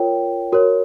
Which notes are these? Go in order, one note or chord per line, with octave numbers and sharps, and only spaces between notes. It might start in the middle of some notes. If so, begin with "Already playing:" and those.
Already playing: F4 A#4 C#5 G5
F#4 A#4 C#5